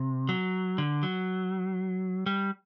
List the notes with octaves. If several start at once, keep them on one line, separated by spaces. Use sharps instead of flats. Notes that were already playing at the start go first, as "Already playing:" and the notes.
Already playing: C3
F#3
D3
F#3
G3